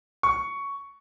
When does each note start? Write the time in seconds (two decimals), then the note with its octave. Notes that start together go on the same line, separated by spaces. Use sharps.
0.23 C#6